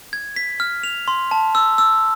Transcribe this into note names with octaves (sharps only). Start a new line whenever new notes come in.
G#6
B6
F6
F7
C6
A5
E6
E6